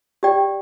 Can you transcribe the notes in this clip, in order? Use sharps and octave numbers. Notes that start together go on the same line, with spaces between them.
G4 D5 G5